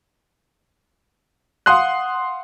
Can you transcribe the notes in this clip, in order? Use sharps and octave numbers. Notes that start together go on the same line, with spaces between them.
F5 F#5 C6 D#6 F#6